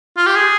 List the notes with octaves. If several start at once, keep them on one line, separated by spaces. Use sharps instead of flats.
F4
G4
G#4